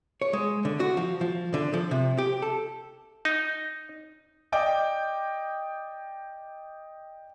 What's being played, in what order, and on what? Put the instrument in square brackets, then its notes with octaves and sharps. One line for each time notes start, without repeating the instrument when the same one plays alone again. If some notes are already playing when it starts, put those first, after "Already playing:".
[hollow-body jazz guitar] C#5
G#3
D3
F#4
F3
F3
D3
F3
C3
G4
A4
[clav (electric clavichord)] D#4
[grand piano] D5 D#5 G5 D6